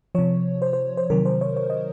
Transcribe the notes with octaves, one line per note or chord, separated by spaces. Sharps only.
C3 F3 C#5
C5
C5
C5
C3 D#3 F#3 A#4
C5
C#5
C#5
D#5